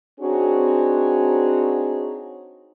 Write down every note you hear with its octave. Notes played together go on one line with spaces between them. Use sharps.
C4 D4 D#4 F#4 G#4 C#5